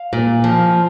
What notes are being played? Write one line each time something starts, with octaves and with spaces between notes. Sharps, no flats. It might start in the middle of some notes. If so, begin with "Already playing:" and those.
Already playing: F5
A#2
F3